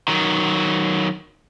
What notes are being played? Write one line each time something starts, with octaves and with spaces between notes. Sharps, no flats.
D#3 F#3